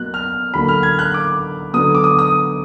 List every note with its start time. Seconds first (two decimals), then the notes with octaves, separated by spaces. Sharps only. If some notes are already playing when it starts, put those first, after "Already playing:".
Already playing: B2 F#3 A#3 F#6
0.14 F6
0.54 D3 F#3 A#3 B5
0.69 F6
0.83 G#6
0.99 F#6
1.14 D6
1.73 D3 F#3 B3 D#6
1.95 D6
2.04 D#6
2.19 D#6